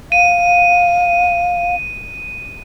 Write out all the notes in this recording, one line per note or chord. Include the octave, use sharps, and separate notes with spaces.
F5 D#7